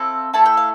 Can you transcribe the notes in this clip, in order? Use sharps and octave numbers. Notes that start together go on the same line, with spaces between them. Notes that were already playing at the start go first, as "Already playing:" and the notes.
Already playing: C4 E4 A4 F5
A3 E4 A4 A5
G5
F5